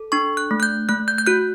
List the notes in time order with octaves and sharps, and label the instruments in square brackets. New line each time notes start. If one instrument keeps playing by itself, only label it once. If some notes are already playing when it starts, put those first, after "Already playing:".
Already playing: [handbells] A4
D4 C#6
F#6
A3
F#6
G6
A3 F#6
G6
G6
F#4 F#6